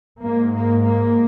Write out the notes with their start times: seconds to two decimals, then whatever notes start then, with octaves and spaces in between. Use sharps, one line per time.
0.23 G#2 A#3
0.54 A#3
0.85 A#3